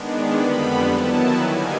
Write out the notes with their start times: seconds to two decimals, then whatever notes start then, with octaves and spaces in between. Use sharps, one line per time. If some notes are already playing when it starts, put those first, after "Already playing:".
Already playing: D#3 G#3 B3 D4
0.38 F2 D3 G3 B3 B5
0.91 D#3 F#3 B3 E4 A5
1.44 D3 G3 A#3 D#4 G#5